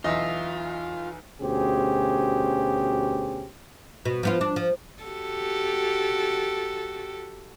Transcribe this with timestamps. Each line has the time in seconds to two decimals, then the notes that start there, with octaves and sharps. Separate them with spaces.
0.04 B1 E2 F4 D#5 E5
1.41 D2 B2 C#4 G4 G#4 C5
4.05 B2
4.23 F3 B3 F4
4.41 D4
4.56 F3
5.03 F#4 G4 A4